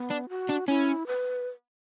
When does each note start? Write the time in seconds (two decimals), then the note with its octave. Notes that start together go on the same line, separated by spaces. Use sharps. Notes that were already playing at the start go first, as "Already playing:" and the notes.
Already playing: B3
0.10 D4
0.29 F#4
0.49 D4
0.68 C#4 E4
1.07 B4